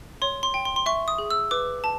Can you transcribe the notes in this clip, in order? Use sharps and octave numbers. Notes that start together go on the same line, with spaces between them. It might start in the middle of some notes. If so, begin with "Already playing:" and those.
C#5 C6
C6
G5
C6
C6
E5 C#6
D#6
G#4
E6
B4 D6
A5